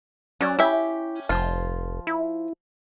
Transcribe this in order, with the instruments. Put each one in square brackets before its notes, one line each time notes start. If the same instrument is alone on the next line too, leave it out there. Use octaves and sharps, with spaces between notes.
[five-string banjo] F#3 D5 [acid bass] C#4
[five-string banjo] C#4 G4 E5 [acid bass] E4
[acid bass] F1 [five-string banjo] F3 F4
[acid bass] E4